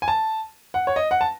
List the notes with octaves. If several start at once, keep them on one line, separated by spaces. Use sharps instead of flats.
G#5
A5
F#5
C#5
D#5
F#5
A5